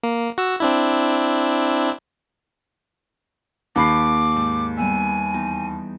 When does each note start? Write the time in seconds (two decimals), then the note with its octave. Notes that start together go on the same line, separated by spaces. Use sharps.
0.03 A#3
0.38 F#4 E6
0.60 C4 D4 E4
3.76 D#2 A#3 D#4 B5 D6 C7
4.36 G#2
4.77 G3 B3 E5 G#5
5.34 E2 D#4